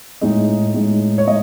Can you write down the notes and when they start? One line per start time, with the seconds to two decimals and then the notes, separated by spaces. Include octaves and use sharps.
0.21 A2 G#3 D#4
0.74 A2 G#3 D#4
1.18 C#5
1.27 A2 G#3 D#5